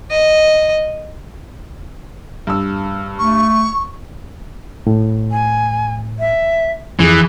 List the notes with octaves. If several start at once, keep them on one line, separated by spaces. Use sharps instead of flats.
D#5
G2 E6
A3 C#6
A2
G#5
E5
F2 E3 G#4